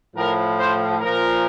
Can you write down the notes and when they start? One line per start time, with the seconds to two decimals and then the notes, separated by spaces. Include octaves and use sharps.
0.16 A2 F3 A#4
0.59 C5
1.01 A#2 F3 A#4